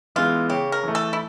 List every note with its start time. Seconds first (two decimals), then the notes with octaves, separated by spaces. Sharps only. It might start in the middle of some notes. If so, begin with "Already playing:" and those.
0.16 E3 G#3 B3 F4
0.50 C#3 G4
0.72 A#4
0.83 E3 A3
0.95 A4
1.13 E4